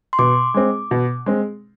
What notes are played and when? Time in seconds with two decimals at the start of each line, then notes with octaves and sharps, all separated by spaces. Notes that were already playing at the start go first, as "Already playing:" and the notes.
0.13 C6
0.19 B2 D6
0.54 G#3 C4
0.91 B2
1.26 G#3 C4